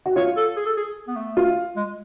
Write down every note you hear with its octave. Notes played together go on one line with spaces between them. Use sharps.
F#4
F4 C#5
A4
G#4
A4
G#4
B3
A3
F4
G#3